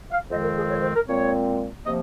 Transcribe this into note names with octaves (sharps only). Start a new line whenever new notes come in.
F5
F2 D#3 G#3 C4 D#5
A#4
G#4
C#5
C5
A#4
A#2 G#3 C4 C#5
C3 F3 A#3 D#5